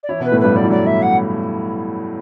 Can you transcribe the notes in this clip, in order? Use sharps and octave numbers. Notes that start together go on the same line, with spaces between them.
D5
E3 E4 C#5
B2 B3 B4
A2 A3
G2 G3 B4
F#3 D5
E3
F#3 D5
E5
F#5